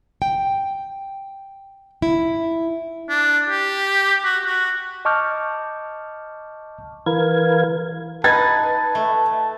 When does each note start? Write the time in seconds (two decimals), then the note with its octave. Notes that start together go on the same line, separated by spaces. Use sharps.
0.22 G5
2.02 E4
3.09 D4
3.49 G4
4.24 F#4
4.46 F#4
5.05 D#5 A5 C#6 D6 F6 G6
7.06 E3 A#4 B4 F5 G#6
8.24 D#4 B4 A5 B5 G#6 A6
8.95 A3